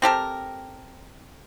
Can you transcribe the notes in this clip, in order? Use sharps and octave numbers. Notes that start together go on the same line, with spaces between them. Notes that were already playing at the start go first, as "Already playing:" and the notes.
C4 G4 A4 A#4